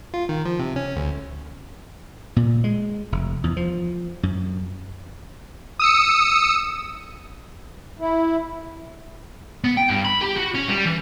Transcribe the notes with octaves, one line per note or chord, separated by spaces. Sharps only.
F4
D#3
F3
C3
C#4
D2
A#2
G#3
F1
E2
F3
F#2
D#6 E6 C#7
E4
B3
G5
G2
B5
G4
F#4
C#4
G3
E3